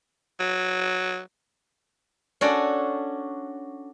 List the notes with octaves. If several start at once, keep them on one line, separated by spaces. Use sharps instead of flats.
F#3
C#4 D4 F#4 A4 D5